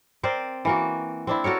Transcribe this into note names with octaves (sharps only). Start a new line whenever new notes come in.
C4 A#4 C5 D5
E3 A#3 F#4
C4 D4 E4
F#4 A4 A#4 C#5